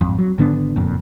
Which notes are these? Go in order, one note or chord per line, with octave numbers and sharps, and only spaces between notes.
G#1 F2
F#3
G#1 D3 B3 D4
F#1 F2 A#2